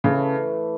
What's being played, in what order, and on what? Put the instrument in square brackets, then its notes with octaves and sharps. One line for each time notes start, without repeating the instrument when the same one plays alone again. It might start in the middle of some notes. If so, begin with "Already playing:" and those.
[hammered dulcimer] A2 E3 A3 [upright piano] C#3